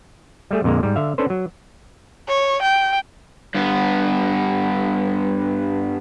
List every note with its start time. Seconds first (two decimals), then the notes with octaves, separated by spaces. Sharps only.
0.51 G3 A3 G#4
0.64 F2 A#2 D3 G#3 A#3
0.83 G#2 G3
0.96 D3 E5 F5
1.18 C#4 D4 A4 B4 C5
1.30 F#3
2.28 C#5
2.62 G5
3.55 G2 B3